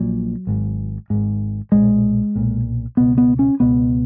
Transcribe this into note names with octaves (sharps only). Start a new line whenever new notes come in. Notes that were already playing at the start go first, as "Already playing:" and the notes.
Already playing: A#1 A#2 F#3
G#1 G#2
G#1 G#2
B1 A#2 G#3
B1 A#2
C#2 B2 B3
B3
C#4
C#2 B2 B3